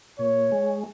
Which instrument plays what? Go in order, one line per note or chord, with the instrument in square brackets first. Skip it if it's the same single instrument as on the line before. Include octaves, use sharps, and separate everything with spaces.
[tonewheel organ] A#2 [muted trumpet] C#5
[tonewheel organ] G#3